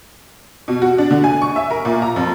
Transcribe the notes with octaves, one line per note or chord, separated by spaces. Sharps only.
B2
F#4
D4
D3
G#5
C#6
E5
A#4
A#2
A#5
F2